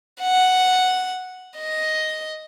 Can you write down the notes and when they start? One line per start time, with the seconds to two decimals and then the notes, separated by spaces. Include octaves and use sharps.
0.21 F#5
1.58 D#5